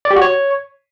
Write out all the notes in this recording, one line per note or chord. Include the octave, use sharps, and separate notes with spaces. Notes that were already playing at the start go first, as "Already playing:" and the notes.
D5
G4
F#4
C#5